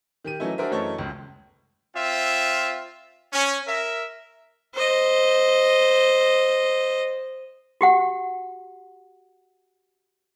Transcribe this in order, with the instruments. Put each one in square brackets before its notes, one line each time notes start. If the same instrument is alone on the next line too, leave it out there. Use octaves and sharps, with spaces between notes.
[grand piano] D#3 G4 D#7
E3 F#3 A3 C#4 D#4 E4
D4 F#4 G#4 A#4 C5 E5
F#2 E3 A3 C#5 D#5 A5
C#2 C#3 G#3
[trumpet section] C4 F4 E5
C#4
A#4 E5
[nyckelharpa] C5 D#5
[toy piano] F#4 G4 F#5